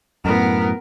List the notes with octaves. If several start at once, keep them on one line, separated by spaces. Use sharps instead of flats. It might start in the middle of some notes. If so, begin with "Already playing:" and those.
F#2 A2 B3 A#4